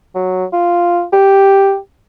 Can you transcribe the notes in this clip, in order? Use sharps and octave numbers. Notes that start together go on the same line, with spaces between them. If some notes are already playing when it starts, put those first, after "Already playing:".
F#3
F4
G4